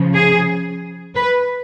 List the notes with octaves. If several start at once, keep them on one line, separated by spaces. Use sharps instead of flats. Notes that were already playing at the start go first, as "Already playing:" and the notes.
Already playing: C#3 F3
G#4
B4